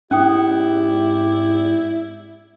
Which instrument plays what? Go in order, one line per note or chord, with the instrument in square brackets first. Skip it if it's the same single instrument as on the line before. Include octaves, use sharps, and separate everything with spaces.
[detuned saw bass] G#2 [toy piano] C#4 G5 D#6 [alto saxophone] E4 [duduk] G4